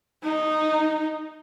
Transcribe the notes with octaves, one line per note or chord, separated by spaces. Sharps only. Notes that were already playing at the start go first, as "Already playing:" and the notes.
D#4